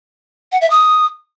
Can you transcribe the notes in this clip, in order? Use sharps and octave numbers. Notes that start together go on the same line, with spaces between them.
F#5
E5
D#6